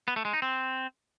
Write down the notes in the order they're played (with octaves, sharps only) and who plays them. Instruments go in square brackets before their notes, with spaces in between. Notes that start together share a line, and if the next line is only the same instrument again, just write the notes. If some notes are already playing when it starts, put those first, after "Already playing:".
[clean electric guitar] B3
A3
G#3
D#4
C4